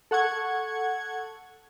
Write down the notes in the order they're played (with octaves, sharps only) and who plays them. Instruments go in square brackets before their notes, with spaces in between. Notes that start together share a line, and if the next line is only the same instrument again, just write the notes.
[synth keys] A4 F#5 C#6 G#6